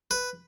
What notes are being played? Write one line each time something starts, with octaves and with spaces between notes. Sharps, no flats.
B4